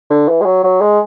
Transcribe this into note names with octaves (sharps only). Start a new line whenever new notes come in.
D3
E3
G#3
F#3
F#3
G#3